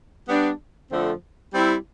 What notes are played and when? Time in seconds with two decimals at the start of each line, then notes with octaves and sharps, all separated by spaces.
0.28 G3 B3 D4
0.91 F2 D3 F3 A3 C4
1.52 G3 C4 E4